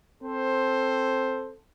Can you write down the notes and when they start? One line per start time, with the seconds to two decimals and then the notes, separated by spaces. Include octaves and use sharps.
0.23 C4 A4 C5